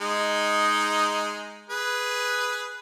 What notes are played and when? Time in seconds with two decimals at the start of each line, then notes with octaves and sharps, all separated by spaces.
0.01 G#3 D#4
1.70 G#4 B4